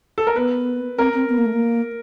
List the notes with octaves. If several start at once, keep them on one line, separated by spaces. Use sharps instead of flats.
A4
A#4
B3 B4
C4 A#4
C4
B3
A#3
A3
A#3